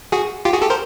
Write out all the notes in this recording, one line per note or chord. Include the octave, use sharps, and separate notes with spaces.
F#4 G#4
F4 G4
F#4 G#4
G4 A4
A#4 C5